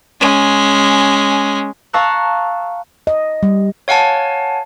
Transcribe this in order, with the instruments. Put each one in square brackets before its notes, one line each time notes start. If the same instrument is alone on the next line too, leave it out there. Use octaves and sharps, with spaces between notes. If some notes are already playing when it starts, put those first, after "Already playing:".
[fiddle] G#3 C#4
[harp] F5 A5 A#5 C#6 E6 F#6
[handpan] D#5
G3
[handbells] C#5 F5 F#5 G#5 A5